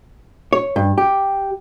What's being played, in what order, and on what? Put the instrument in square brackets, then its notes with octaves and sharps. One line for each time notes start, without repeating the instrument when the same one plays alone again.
[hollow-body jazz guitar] C#5
G2
G4